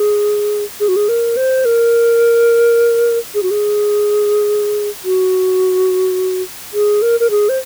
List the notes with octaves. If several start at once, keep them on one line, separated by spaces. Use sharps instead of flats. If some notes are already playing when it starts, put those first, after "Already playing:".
Already playing: G#4
G#4
F#4
G#4
A#4
C5
A#4
G#4
F#4
G#4
F#4
G#4
A#4
A#4
G#4
C5